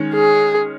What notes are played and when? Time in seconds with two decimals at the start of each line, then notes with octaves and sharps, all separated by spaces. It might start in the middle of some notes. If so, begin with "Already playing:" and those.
Already playing: D#3 G#3 C#4
0.14 G#4